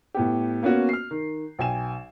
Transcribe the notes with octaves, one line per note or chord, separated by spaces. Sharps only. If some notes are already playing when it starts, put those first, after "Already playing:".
A2 B3 G4
A#3 B3 C#4 F#4
F6 C7
D#3
B1 G5 G#5 E7